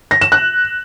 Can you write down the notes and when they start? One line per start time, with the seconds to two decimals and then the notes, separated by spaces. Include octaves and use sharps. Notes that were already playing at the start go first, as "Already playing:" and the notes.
0.11 A#6
0.21 E7
0.32 F#6